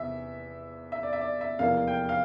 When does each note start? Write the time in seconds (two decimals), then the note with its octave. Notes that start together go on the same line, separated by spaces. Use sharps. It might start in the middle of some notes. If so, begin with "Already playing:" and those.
Already playing: E2 C3 E3 E5
0.92 E5
1.03 D5
1.13 E5
1.21 D5
1.41 E5
1.59 F1 E2 E3 A#3 F5
1.87 G5
2.09 F5